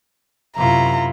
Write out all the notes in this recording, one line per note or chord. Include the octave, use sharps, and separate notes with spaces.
F#2 C3 E4 F4 A#5